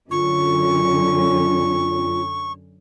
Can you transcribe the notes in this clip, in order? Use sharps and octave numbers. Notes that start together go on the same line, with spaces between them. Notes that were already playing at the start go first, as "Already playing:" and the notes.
F#2 D3 C#4 F4 C#6